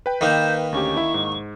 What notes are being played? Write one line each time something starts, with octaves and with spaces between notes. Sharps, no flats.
B4 G5
D#3 A#3 C5
D2 C#4 G4 C#6
E4 E5
G#2